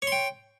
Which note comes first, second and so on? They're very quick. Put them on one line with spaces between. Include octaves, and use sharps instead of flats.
C#5 C6 G5